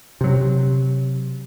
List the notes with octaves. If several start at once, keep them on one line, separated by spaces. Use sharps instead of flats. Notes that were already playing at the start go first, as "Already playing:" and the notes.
C3 F#3